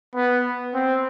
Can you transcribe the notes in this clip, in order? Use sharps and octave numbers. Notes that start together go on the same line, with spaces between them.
B3
C4